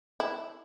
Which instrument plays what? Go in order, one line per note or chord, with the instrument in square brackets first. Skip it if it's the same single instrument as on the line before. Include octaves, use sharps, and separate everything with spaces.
[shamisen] E4